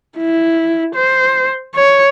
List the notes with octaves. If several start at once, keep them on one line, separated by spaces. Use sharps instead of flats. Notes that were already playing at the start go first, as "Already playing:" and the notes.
E4
C5
C#5